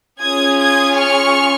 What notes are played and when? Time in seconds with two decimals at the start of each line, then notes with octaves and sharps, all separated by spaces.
0.21 C#4 F4 G#4 D#6 G#6
0.59 D#6 G#6
0.96 C#6 F6